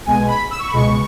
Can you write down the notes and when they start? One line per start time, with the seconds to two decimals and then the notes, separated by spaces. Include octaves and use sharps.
0.06 B1 B2 G#3 G#5
0.28 B5
0.51 E6
0.59 C#6
0.67 B5
0.73 C#2 B2 G#3 C#6